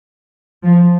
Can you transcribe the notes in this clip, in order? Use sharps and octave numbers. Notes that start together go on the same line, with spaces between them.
F3